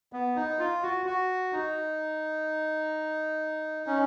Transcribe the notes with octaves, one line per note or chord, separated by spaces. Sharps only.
B3
D#4
F4
F#4
F#4
D#4
C#4